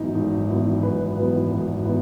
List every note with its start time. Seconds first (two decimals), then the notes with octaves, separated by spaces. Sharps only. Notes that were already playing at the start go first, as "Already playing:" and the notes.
Already playing: G#1 F#2 E3 B3 D#4
0.15 G#1
0.49 F#2 E3 B3 D#4
0.83 G#1 B4
1.17 F#2 E3 B3 D#4 B4
1.51 G#1
1.85 E3 B3 D#4